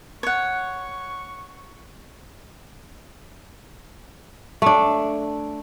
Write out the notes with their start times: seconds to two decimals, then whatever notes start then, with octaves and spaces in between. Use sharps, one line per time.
0.23 C#5 F#5 C#6
4.62 A3 D4